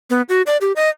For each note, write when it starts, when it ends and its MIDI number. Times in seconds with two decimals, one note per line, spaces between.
0.10 0.22 59
0.29 0.42 66
0.47 0.57 74
0.61 0.72 67
0.76 0.89 75